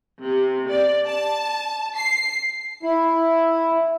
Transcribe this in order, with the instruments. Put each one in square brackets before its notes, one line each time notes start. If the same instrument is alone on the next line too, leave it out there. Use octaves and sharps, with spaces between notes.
[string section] C3
D5
A5
C7
[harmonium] E4